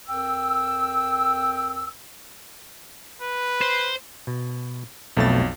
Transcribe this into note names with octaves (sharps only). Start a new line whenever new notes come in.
F2 A#4 G5 E6
B4
C5
B2
B1 F2 B2 A3 A6